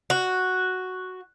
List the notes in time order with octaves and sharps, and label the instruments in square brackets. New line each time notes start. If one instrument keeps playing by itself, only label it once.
[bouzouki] F#4